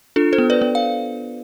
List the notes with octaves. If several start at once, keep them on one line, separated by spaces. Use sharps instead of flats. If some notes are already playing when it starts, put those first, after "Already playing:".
D4 F4 A4
A4 C5
B3
B4 D5
B3
F5